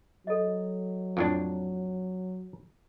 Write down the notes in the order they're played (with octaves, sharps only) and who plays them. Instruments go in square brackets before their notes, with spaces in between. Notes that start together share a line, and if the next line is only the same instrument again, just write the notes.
[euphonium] F#3 [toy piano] A4 D#5
[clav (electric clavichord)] F2 A2 D4